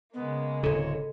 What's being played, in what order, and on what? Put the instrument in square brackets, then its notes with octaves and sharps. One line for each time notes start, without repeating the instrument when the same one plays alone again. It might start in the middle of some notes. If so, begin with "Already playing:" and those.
[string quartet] C#3 G#3 A#3 [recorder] B3
[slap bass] D1 C3 [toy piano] A4 [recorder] C#5